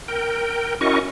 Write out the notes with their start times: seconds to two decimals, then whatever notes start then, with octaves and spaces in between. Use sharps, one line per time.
0.08 A#4 G5
0.81 C#4 E4 F#4 A#4 D#5 C#6